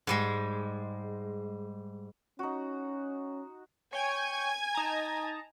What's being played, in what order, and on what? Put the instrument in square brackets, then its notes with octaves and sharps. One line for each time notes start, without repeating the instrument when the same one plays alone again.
[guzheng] G#2 G3 G#3
[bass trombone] C#4 [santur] D#4 F#4
[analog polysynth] C#5 G5 C#7 [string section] G#5 G#6
[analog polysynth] D#4 A5 A#5